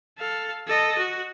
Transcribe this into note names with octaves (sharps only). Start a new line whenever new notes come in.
A4 F5
A4 D#5
F#4